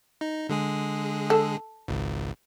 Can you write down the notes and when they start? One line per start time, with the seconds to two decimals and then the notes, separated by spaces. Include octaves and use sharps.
0.21 D#4
0.49 D3 G#3 G#4
1.30 A4
1.88 G#1 C#2